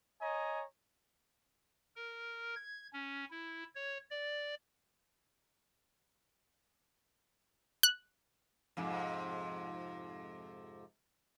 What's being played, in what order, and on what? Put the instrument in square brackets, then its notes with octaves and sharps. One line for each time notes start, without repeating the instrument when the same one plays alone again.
[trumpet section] C#5 D#5 G#5 A#5
[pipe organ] A#4
G#6
C#4
E4
C#5
D5
[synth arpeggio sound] F#6
[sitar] F2 G#2 C3